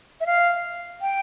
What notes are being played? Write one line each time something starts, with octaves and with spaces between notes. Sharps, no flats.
E5
F5
G5